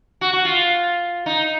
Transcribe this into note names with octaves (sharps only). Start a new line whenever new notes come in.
F#4
F#4
F4
D#4